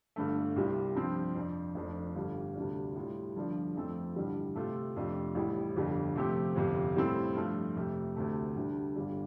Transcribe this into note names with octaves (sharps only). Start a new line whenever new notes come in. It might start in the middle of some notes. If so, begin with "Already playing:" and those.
G1 G2 D3 A3
C2 C3 G3 F4
G2 F3 C4
F2 F3 D4
F1 F2 F3 D4
G1 G2 G3
D2 C3 G3 D4
A2 G3 F4
G1 G2 F3 D4
F2 F3 A3 C4 A4
A1 G2 D3 G3
C3 A3 F4 A4
F2 C3 A3 D4 F4
A1 A2 G3
G1 F2 D3 G3
C3 F3 A3 C4 G4
G1 F2 C3
A2 G3 C4 A4
G2 F3 A3 F4
F2 C3 A3
D2 C3 A3
D2 D3 G3
G1 G2 G3 D4